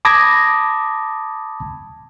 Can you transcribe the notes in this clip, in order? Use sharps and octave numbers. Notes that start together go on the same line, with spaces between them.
A5 B5 D6 D#6 G#6 A#6